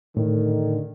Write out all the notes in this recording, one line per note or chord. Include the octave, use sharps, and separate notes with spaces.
A2 D3 D#3